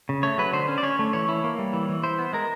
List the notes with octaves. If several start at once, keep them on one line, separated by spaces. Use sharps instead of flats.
C#3
A3 C#5
F#3 B4
D3 C5
C#4
D5
C#4 C#5
A3
E3 C#5
E4
A#3
G3
E3
E3
E4 C5
B3
G#3 A#4